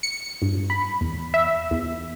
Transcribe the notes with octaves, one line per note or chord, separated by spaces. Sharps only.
C#7
G2
B5
E2
E5
E2